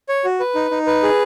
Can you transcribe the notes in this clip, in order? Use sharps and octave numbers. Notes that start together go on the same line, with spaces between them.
C#5
F#4
B4
D#4
D#4
B4
G#4